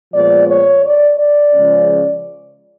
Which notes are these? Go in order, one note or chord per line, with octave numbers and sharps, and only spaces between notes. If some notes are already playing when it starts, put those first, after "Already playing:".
A#2 F3 G#3 B3 D5
C#5
D5
D5
C#3 F3 G#3 C#4